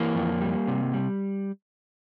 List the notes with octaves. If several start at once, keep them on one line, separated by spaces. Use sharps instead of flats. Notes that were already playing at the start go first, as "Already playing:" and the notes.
Already playing: E3 A#3
F2
G3
C3
G3